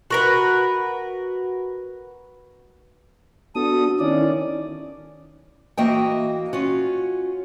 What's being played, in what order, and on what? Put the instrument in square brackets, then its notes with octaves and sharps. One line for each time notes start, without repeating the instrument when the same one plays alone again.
[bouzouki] F#4 A#4 B4
[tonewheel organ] B3 D4 F#4 [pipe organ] A4 D#6
[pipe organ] D#3 C#4 D5 [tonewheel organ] E4
[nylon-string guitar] E3 A#3 F#4 D#5 E5 G5
C#4 F4 F#4